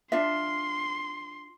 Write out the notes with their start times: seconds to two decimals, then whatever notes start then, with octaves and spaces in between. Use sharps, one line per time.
0.12 D4 F4 E5 C6